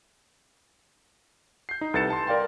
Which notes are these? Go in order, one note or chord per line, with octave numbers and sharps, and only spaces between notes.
G6 C7
D#4
C2 A4 B4 A6 C#7 E7
A5 C6
A#4 D5 F5 G5 C6